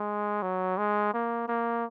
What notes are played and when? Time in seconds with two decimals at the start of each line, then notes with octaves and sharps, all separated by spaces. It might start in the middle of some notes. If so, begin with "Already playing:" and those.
Already playing: G#3
0.42 F#3
0.78 G#3
1.14 A#3
1.48 A#3